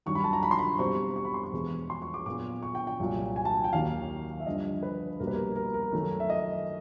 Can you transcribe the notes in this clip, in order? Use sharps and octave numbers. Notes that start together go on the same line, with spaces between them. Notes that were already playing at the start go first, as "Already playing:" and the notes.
G2 D#3 F#3 C#6
B5
A5
A#5
B5
C6
B5
B2 G3 C4 C#6
C#6
B5
C6
C#6
E2 B2 G#3 B3
C6
C#6
D6
A#2 F#3 B3 D6
C#6
G5
G5
C2 A#2 F#3
G#5
A5
G5
D#2 D#3 F#3 A#3 F5
E5
G2 D3 F3 D#5
B4
C2 B2 G3 A#3 A#4
B4
A#4
A#4
A#4
F#2 D#3 F#3 A3
E5
D#5